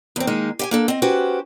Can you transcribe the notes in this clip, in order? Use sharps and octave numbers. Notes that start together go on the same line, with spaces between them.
E2 C4
D#3 G#3 A#3 D#4
G4 F5 G#5
A#3 D4 A4
C4 D#5
C#4 F#4 G4 B4 C5